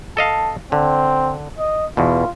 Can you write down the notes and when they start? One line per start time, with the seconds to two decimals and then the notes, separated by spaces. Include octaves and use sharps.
0.17 A4 D#5 F5 A5
0.72 D3 C4
1.59 D#5
1.97 E2 B2 F4